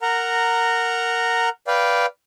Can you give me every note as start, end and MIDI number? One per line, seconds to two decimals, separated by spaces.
0.02 1.49 70
0.02 1.49 78
0.02 1.49 82
1.67 2.06 71
1.67 2.06 74
1.67 2.06 77
1.67 2.06 79